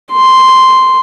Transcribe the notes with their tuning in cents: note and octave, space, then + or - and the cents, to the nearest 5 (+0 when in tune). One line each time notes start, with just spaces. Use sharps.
C6 -5